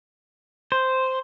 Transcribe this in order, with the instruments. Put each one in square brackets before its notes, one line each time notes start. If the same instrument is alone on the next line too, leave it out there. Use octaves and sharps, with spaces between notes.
[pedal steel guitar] C5